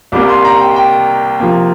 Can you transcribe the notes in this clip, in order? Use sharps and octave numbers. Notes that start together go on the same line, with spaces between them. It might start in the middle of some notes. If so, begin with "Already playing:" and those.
C2 C3 G3 A#3 D6
C6
A#5
G5
G5
C3 F3 A#3